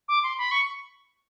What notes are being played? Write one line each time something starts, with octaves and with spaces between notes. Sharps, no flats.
D6
C6
B5
C#6